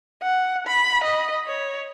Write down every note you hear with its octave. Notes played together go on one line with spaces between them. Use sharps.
F#5
B5
D#5
C#5